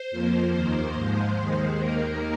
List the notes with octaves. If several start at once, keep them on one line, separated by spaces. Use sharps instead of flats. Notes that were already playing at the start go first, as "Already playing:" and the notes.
Already playing: C5
F2 F3 A#3
D#2 D#3 A#3
G#2 F3 G#3 C5
D#2 D#3 G#3
D#2 D#3 A#3 A#4